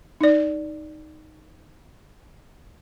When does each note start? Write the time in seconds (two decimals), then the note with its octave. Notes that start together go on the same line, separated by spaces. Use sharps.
0.21 D#4 D5